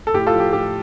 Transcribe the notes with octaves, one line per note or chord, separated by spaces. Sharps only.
A4
A2 G4
F4 A4
F3
G4
A2 G4